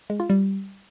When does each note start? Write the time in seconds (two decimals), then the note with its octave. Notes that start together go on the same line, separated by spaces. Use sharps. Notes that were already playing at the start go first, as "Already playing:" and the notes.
0.10 G#3
0.20 F4
0.30 G3